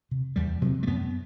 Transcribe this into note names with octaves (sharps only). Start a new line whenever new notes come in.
C3
E2 G3
C3 F#3
A3
F#2 B3